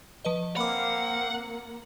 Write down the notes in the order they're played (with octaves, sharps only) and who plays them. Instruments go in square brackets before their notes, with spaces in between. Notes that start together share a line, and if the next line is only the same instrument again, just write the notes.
[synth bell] F3 B4 D#5
[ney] A#3 [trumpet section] C4 F5 [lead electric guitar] F#5 [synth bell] B5 D6